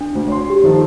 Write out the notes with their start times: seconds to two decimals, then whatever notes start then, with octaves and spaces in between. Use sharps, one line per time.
0.01 D4
0.15 D2
0.27 C#5 C6
0.50 G4
0.63 D#3 F3 A4